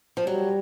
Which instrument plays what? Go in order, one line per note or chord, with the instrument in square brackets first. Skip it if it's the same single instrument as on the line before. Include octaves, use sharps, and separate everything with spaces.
[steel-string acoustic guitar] F3
[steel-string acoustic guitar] F#3 [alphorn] G3